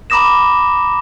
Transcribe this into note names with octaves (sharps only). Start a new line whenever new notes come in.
A#5 B5 D6 D#6 A#6 E7